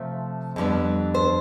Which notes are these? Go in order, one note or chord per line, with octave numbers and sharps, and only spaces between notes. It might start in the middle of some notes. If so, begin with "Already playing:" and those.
Already playing: C3 F3 A3 C4
F2 D3 G3 B3
C5